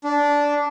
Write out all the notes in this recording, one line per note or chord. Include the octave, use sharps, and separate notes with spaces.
D4